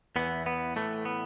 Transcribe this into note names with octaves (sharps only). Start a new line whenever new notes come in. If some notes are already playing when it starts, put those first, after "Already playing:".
E2 E3 B3
B3
A2 E3 A3
B3